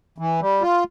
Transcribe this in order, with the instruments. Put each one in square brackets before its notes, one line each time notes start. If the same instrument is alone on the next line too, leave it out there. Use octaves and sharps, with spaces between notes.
[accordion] E3
G3
F4